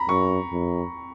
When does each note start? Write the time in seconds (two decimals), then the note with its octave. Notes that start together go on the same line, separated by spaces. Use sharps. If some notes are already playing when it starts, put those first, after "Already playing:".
Already playing: A#5 B5
0.08 F#2 C#6
0.52 F2